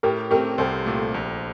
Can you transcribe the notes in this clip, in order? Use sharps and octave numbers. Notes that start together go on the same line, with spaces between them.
A2 G4 A#4
A3 C4 G4 A#4
C2 A4 C5
A#2 A3
A#1